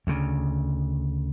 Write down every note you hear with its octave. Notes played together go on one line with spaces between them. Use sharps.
D2 C#3